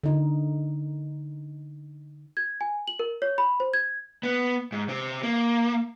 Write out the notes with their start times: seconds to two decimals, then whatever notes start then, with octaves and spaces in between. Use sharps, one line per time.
0.04 D3 D#4
2.37 G#6
2.61 G#5
2.88 F#7
2.99 A#4
3.22 C#5
3.38 B5
3.60 C5
3.73 G#6
4.23 B3
4.72 G#2
4.88 C3 C4
5.23 A#3